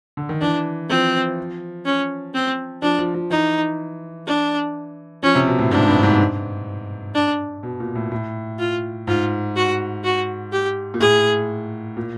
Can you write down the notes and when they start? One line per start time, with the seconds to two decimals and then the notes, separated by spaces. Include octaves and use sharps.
0.17 D3
0.29 D#3
0.41 E3 D4
0.90 F3 C4
1.85 C#4
2.34 C4
2.82 F3 D4
2.99 F3
3.14 F3
3.30 E3 D#4
4.27 D4
5.23 F3 C#4
5.35 C3
5.47 B2
5.59 A2
5.71 G#2 D4
5.88 G2
6.03 G#2
7.15 D4
7.63 B2
7.80 A#2
7.95 A2
8.12 A2
8.59 F4
9.07 G#2 F4
9.56 F#4
10.04 F#4
10.52 G4
10.94 A#2
11.00 A2 G#4
11.97 A#2